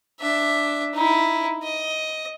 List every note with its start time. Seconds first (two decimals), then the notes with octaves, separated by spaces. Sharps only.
0.20 D4 E5
0.94 D#4 E4
1.63 D#5